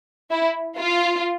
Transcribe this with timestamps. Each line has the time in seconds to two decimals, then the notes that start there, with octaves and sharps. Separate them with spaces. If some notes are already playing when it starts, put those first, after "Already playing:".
0.30 E4
0.77 F4